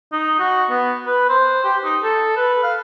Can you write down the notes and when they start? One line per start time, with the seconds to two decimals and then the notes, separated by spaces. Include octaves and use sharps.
0.12 D#4
0.39 F#4
0.70 B3
1.06 B4
1.29 C5
1.64 G4
1.84 D#4
2.03 A4
2.37 B4
2.63 F5